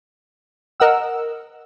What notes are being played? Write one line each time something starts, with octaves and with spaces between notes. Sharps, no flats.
A#4 D#5 F#5 E6